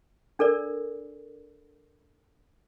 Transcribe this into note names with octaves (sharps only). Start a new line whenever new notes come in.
D4 A4 A#4 D5